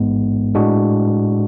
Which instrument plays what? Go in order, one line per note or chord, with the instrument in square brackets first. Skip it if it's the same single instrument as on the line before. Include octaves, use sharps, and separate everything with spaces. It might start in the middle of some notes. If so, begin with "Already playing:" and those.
Already playing: [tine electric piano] A1 G#2 G#3 B3
A2 G#3 D4 F#4